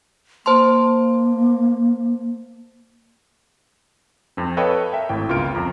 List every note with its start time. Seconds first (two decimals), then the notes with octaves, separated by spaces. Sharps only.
0.46 A#3 C5 A5 C6
4.37 F2 C4
4.57 A4 B4 C#5 D#5 F5 G5
4.93 A#4 E5 G5
5.09 G#1 A2 E4 G5
5.28 G1 C#2 F4 A#4 F6 D7
5.55 F2 A#5